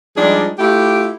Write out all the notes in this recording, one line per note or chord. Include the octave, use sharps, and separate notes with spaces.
F3 G3 G#3 D4 D#4 G#4
A3 E4 F4 G4